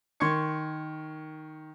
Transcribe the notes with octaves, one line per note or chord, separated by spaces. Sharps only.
D#3 C6 C#6 G#6 C#7